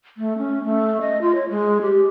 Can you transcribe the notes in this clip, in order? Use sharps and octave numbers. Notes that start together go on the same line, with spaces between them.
A3
C#4
A3
D#5
F4
C#5
G#3
G4